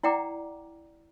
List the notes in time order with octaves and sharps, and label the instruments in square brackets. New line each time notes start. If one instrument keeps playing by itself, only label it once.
[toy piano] E4 D5 F#5 G5 A#5 D6